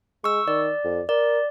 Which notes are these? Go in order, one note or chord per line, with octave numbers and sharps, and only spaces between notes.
G#3 C#6 E6
D#3 D5
F2
A#4 D5